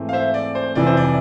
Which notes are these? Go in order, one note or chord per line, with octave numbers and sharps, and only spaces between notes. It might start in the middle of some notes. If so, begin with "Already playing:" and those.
Already playing: G#2 E3 A3 C4
F5
C5 E5
D5
C5
F1 F2 E3 D5
C5
D5